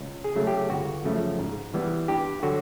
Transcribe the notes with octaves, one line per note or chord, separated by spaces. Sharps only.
C#2
G#4
C#3 F#3 A3
G4
G1 F#4
F#2 C#3 F3 A3
G#2
E3 G3 B3
G2 G4
D3 F#3 F#4